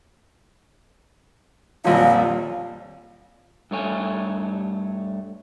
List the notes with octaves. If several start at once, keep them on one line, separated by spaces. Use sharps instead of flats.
D#1 A#1 F2 F5
G2 A3 C#5 G#5